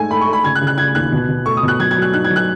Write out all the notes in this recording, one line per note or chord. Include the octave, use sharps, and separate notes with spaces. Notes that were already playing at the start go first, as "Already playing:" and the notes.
Already playing: G#2 A3 G#5
A3 B5
C#6
A3
B5
C#3 G#6
F#6
C#3
F#6
C#3 G#6
D#2 F#6
B2
B2
A3 C#6
D#6
B2 F#6
F#3 G#6
G#6
F#3
F#6
D#4 F#6
G#6
F#3
F#6